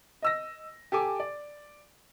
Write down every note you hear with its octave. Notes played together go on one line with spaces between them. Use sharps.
D#5 E6 A#6
G4 A4 G#5 D6
D5